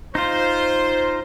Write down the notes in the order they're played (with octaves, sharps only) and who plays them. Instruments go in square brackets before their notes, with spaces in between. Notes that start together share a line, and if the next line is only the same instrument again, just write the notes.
[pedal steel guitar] D#4 F4 [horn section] C5